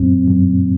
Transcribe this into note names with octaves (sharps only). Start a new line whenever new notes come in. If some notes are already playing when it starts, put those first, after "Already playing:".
Already playing: F#2 C4
F#2